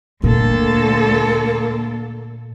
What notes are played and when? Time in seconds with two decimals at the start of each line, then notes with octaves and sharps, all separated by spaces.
0.24 D2 A#2 A#3 A4